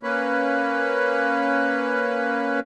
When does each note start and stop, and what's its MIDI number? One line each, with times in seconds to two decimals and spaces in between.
0.03 2.60 58
0.03 2.60 61
0.03 2.60 71